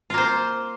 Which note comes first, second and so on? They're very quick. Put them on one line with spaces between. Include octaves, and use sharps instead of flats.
F4 A#3 C5